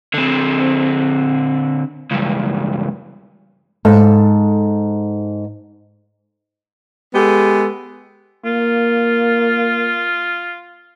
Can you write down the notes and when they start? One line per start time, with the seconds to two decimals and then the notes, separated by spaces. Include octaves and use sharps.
0.14 D3 C4
2.11 C#2 G2
3.85 G#2 A4 F5
7.15 G#3 B3 G4 A4
8.45 A#3 F4